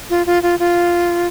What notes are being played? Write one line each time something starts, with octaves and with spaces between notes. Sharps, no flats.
F4
F4
F4
F4